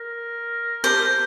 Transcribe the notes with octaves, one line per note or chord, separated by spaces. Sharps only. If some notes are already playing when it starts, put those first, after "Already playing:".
Already playing: A#4
G4 C5
A#4